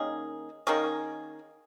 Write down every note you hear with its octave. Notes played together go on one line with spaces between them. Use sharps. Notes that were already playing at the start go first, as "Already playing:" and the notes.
Already playing: D#3 A#3 C#4 G#4
D#3 A#3 C#4 G#4